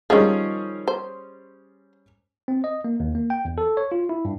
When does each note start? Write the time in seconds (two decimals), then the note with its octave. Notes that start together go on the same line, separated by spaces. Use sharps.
0.10 D#3 F3 G3 C#4 G#4
0.88 C5
2.48 C4
2.64 D#5
2.85 A#3
3.00 D#2
3.15 A#3
3.30 G5
3.45 E2
3.58 A4
3.77 C#5
3.92 F4
4.09 E4
4.25 G2